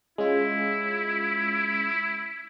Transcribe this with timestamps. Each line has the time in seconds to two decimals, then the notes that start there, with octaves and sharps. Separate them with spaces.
0.18 G#3 C#4 E4 F4